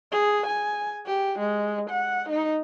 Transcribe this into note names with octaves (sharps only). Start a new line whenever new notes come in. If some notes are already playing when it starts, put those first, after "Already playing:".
G#4
G#5
G4
G#3
F#5
D#4